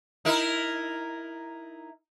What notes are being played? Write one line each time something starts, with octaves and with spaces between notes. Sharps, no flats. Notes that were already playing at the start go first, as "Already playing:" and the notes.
D#4 E4 A#4